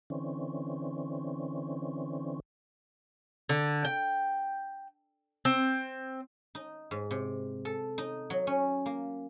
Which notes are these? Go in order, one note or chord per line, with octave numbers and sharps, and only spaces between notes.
D3 E3 C4 C#4
D3
G5
C4
D#4
G#2
C3
A4
D#4
F#3
C#4
A#3